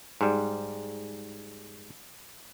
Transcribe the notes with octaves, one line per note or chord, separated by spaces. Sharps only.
G#2 G3